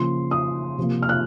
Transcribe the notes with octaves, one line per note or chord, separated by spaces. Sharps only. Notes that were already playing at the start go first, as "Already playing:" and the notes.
Already playing: C#3 F3 A#3 C6
D#6
C3 F3 A#3
F6
F#6